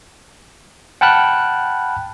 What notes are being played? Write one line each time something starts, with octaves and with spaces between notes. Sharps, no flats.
F#5 G5 A5 B5 F6 F#6